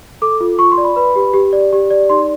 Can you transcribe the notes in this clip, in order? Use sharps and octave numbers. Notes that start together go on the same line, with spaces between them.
A4 D6
F4
F4 C#6
C6
D5
B5
B4 B5
G4
G4
D5
G4
D5
D#4 C6